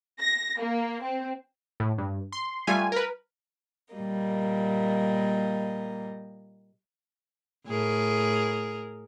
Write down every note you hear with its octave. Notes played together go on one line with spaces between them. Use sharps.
A#6
A#3
C4
A2
G2
C6
G3 A3 F4 G#5
A#4 B4
A#2 G3 A#3 D#5
A2 G#4 A#4